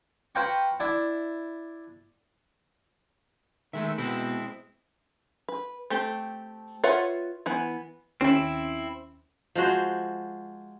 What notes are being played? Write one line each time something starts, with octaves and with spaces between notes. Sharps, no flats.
B4 C5 F5 G5 A#5 C#6
D4 E4
D#3 G#3 A3 E5
B2 G#3 C4 E4
B4
A3 C4 G4
F4 B4 C#5 E5 F#5
E3 B3 B4 G#5
D#2 C4 C#4 E4
F3 G#3 F#4 C5